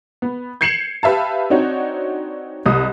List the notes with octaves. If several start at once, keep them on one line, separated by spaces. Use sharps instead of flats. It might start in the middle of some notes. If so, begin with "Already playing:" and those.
B3
G6 G#6 C7 C#7 E7 F#7
G4 B4 E5 F5 A5
C4 D4 D#4 F#4 C#5
C2 D#5 D#6